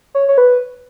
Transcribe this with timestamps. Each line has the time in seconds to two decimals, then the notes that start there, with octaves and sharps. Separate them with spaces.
0.15 C#5
0.29 C#5
0.38 B4